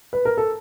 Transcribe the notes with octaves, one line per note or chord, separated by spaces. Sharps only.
B4
A#4
A4